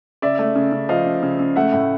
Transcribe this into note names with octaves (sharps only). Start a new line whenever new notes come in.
C#3 D5 E5
A3
C#3
C#3
F3 D#5 F5
C#3
C#3
C#3
A3 E5 F#5
A2